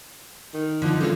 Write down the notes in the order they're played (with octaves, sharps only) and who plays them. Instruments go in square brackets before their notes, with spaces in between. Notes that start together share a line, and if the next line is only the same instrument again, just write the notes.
[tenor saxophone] D#3
[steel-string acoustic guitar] D3 F3 D#4
[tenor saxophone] D3 [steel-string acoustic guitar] G#3 C#4 F4